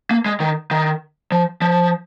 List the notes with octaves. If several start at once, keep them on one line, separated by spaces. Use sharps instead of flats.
A#3
G#3
D#3
D#3
F3
F3